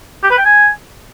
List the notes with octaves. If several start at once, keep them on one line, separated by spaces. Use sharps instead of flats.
G4
B4
G5
G#5